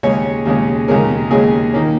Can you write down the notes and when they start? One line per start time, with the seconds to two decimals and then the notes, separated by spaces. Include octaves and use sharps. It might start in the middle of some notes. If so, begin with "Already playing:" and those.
0.03 D#2 C#3 G#3 C#4 C#5
0.45 D#2 C#3 G#3 C#4
0.88 D#2 C#3 G#3 C#4 A#4
1.31 D#2 C#3 G#3 C#4 G#4
1.73 D#3 A#3 C#4